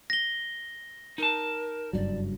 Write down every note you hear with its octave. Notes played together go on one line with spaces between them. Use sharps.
A#6 G7
D#4 A#4 A5
F#1 G2 F#3 D5